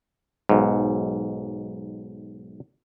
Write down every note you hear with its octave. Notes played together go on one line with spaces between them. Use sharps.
B1 G#2